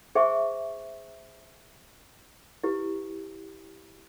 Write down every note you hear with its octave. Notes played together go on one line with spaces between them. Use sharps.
G#4 C5 E5 G#5 C#6
E4 G4 B4